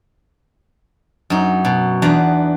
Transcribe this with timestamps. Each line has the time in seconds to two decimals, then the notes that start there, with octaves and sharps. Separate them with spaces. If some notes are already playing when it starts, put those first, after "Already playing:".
1.30 F#2 D#4
1.65 B2
2.02 E2 B3 D4 A#5